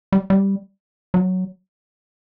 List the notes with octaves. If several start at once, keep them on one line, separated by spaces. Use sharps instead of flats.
G3
G3
F#3